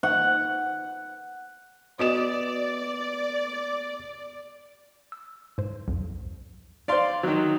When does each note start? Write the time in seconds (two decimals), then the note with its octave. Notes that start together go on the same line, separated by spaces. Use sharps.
0.03 F#5
1.99 B3 F#4 D5 D#5 D#6 E7
5.12 E6
5.58 G#2 C5
5.88 B1 F2
6.88 D#4 C5 D5 F5 C6
7.23 D#3 F#3 E6 F#6